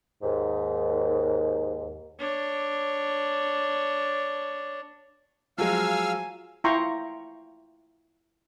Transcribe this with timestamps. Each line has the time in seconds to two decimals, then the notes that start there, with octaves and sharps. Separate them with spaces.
0.23 D#2 G#2
2.19 D4 C#5
5.58 F3 F#3 G#3 F5 G#5 E6 F6
6.64 E4 F4 G5 A#5 C6 C#6